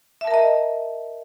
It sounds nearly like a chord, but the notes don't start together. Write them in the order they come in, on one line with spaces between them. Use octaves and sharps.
E5 A5 A#4 A#5 D#5